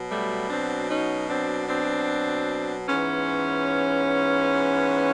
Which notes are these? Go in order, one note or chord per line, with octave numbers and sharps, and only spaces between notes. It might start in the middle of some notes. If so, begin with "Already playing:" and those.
Already playing: B2 F#3
G3 A3
C4 D4
C#4 D#4
C4 D4
C4 D4
G#2 E3 B3 C#4